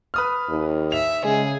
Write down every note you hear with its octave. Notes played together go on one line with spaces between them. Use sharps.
B4 D#6 F6
D#2
E5 F7
C#3 G#3 G#4